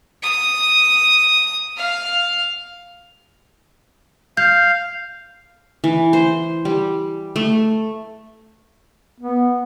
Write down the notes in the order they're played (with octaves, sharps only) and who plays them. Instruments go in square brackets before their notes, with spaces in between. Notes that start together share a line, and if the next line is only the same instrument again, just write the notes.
[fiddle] D#6
F5
[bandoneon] F5 [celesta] G6
[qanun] E3
C5
G3
A3
[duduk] B3